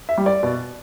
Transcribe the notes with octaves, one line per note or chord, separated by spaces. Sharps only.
E5
G3
D5
B2